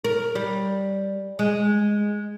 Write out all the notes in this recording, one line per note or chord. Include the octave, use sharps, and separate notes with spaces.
A#4
G3
G#3